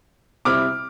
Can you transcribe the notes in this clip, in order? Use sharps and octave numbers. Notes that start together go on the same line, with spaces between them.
C3 G3 C4 E4 D6 F6